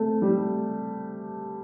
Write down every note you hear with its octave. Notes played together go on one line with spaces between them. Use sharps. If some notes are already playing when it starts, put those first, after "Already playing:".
Already playing: A3 C4
G3